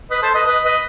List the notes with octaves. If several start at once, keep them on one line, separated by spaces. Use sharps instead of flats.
B4 D#5
A4 C5
B4 D#5
B4 D#5
B4 D#5